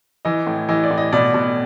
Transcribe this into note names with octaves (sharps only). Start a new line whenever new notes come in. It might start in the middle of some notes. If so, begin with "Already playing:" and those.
E3 D#5
A2
E3 D#5
D5
A2
D#5
B2 D5
B2